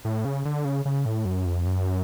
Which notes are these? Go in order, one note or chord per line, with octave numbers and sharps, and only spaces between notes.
A2
C#3
D3
C#3
C#3
A2
F#2
F2
F#2